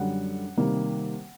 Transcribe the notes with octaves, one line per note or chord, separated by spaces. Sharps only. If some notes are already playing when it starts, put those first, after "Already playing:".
Already playing: F#2 D3 G3 F#5
C3 D#3 G3 A#3